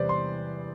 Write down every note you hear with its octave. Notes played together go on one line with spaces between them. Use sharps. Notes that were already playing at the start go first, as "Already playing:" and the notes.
Already playing: E2 C3 G3 B4 C5 D5
C6